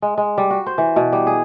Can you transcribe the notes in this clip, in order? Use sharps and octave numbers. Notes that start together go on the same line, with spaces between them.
G#3
G#3
G3
F#4
C5
E3
B2
G3
G#4